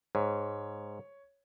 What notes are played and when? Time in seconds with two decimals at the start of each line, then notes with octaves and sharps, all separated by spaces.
0.15 G#2 C#5